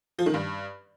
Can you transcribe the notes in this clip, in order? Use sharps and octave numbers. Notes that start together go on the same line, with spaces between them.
F3
D#3
G2